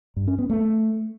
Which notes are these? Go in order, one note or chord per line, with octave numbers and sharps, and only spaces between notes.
G2
C#4
B3
A3